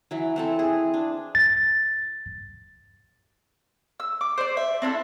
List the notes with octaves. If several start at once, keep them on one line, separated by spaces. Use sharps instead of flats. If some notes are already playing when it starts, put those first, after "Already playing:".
E3 F#3
E3 C4 A4
G#4
D4
A6
E6
D6
C5 D5
E5
C4 D4 E4 A4